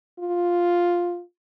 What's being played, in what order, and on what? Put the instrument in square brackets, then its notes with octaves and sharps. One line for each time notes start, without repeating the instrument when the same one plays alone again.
[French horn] F4